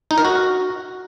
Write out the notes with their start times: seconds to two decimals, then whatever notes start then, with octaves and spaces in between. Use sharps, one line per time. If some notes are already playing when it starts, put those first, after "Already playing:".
0.11 D#4
0.18 A#4
0.25 F#4